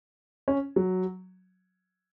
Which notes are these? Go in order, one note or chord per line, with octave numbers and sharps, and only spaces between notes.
C#4
F#3